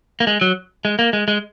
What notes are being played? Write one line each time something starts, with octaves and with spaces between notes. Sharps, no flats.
A#3
G#3
F#3
G#3
A#3
G#3
G#3